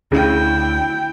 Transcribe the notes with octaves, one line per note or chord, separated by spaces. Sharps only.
D2 C#3 E4 G5